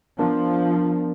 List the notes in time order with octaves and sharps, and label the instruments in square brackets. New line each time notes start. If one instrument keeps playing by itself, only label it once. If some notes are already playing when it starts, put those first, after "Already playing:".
[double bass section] F3 [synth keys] B3 D4 A#4